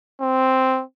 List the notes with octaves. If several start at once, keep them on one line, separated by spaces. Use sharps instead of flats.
C4